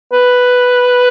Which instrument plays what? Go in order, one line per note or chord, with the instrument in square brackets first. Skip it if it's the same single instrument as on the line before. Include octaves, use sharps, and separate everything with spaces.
[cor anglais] B4